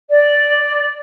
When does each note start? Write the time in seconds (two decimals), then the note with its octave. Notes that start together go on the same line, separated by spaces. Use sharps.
0.10 D5